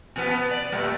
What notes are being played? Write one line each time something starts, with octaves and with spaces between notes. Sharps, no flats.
B2 F3 B3
B3
D5
A#2 G3 A3